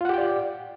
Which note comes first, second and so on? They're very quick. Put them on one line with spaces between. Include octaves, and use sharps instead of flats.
F4 F#5 G4 G5 D5